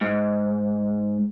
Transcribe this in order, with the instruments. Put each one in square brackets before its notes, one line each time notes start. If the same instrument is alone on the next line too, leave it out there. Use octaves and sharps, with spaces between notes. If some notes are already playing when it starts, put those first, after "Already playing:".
[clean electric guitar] G#2